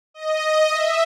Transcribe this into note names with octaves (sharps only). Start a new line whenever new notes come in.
D#5
D#5
E5